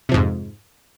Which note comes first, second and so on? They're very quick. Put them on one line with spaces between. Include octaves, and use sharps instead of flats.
C3 F3 G#2 F2